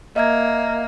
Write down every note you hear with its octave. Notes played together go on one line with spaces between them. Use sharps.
A#3 D#5 E5 G#6